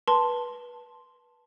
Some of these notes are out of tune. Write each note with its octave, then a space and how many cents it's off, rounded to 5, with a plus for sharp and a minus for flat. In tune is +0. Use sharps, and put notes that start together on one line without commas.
B4 -20 A5 +0 C6 +0